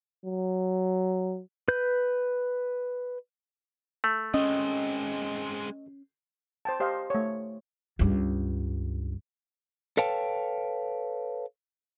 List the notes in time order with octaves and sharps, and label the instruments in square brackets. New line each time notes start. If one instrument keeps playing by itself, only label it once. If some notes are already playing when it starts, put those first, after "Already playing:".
[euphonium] F#3
[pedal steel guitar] B4 G6
[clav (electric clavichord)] A3
[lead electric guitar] G#3 C4 [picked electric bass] C#4 [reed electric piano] D#5
[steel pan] C5 G5 A5
G4 C5 D#5 F5
A3 C#5
[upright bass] C#2 G2
[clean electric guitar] A4 B4 C#5 F5 G5 A5